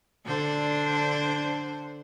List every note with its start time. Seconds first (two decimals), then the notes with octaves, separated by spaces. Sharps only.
0.25 D3 D4 C5